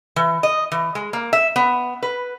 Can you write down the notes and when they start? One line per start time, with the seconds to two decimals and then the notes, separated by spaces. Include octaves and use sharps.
0.16 E3
0.43 D#5
0.72 E3
0.95 G#3
1.13 A#3
1.33 E5
1.56 B3
2.03 B4